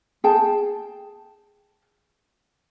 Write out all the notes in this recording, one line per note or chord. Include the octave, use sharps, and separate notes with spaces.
G#4 G5 A5